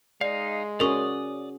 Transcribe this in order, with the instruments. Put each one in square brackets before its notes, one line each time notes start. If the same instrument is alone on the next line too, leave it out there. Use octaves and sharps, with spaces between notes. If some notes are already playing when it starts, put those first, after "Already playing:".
[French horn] G#3 [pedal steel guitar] D#4 F5 [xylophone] D5
[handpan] C#4 F#4 G#4 [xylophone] A#4 C#6 [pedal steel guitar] D5 D#6